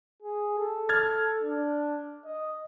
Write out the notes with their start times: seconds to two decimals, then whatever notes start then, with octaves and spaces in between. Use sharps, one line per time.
0.22 G#4
0.58 A4
0.89 F6 G#6 A6
1.42 D4
2.25 D#5